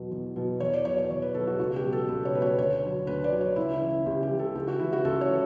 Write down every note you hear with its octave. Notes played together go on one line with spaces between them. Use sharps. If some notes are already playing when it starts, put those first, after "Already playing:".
Already playing: E2 B2 F#3
E2
B2 F#3
E2 C#5
D5
B2 F#3 C#5
C#5
E2 C#5
B4
B2 F#3 A4
F#4
C#2 F#4
G4
B2 F#3
A4
C#2 B4
C#5
B2 F#3 B4
C#5
D2 C#5
D3 F#3
D2 B4
D5
D3 F#3
C#5
C#2 E4
E4
C#3 E3
C#2 G4
G4
C#3 E3
A4
C#2 G4
F#4
C#3 E3 E4
F#4
C#2 A4
C#5
E3